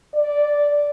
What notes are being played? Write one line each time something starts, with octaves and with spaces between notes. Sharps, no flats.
D5